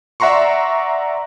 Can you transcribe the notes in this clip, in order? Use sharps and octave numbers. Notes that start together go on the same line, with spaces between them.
D5 E5 F#5 A#5 C6 C#6